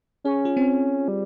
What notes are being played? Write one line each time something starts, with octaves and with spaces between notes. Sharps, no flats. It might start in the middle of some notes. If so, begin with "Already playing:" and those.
C#4 G#4
F4
C4
G3